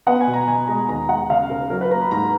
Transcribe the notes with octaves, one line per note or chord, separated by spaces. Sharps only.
B3 F#5
G#5
B2
A#5
B2 G#5
G#3 A#5
D#2 A#5
G#3 F#5
C#3 F5
C#3 A#4
F#3 A#4
B4
A#3 A#5
B5
G#2 A#5